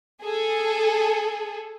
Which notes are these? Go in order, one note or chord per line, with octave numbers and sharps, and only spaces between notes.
G#4 A4